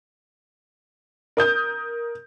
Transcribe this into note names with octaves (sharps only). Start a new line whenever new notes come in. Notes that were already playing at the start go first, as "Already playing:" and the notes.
A#4 D#6 G6